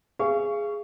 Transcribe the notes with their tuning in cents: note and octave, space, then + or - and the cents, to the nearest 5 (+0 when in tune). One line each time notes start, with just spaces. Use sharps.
G#4 +0 F5 -30 C#6 +10